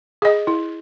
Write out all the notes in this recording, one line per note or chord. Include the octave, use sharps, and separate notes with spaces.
G#4 D#5
E4